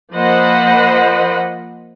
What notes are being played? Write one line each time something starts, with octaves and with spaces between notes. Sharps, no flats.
F3 A#3 C5 D#5 F#5 B5